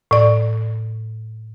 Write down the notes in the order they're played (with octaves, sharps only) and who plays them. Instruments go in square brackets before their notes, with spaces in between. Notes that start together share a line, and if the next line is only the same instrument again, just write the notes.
[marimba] A2 D5